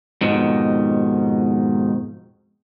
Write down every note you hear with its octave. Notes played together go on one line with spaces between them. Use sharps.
F2 G#2 B2 D#3